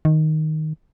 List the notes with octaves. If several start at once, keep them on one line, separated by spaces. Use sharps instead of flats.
D#3